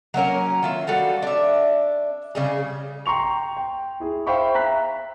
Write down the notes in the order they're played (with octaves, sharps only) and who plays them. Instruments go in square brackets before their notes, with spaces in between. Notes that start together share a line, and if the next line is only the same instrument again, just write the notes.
[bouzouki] F#3 A#3 C#4 A#4
D#3 F4 E5
G3 F#4 A4 F5
D4 E5
C#3 G3 G#4
[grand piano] G5 A#5 C6 C#6 F7
G5
E4 G#4
C5 E5 F5 G5 B5 C#6
E5 A#5 F#6 B6